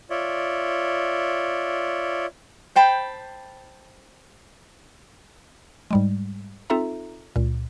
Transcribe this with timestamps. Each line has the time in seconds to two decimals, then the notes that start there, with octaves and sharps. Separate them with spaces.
0.10 F4 C#5 D5 E5
2.76 C5 G5 A5 B5
5.91 G#2 G3 G#3
6.70 C4 D#4 F4 A4 E5 A#5
7.36 C#2 A#2